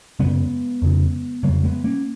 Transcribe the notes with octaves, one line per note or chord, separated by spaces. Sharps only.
F#2 C#3 G#3 B3
F2 C#3
F2 C#3 F#3 A#3
G#3 B3
A#3 C#4